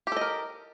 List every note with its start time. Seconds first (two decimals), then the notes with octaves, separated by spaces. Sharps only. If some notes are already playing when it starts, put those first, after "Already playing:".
0.07 G4
0.12 A4
0.17 D#5
0.21 A#4